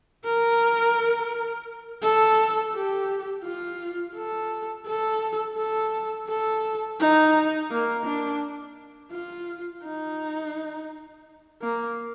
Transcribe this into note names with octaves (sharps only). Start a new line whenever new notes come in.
A#4
A4
G4
F4
A4
A4
A4
A4
D#4
A#3
D4
F4
D#4
A#3